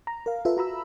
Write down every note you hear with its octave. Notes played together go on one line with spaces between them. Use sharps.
A#5
A#4 F5
F4 A4 B4 E5
F#4 A#5 B5 E6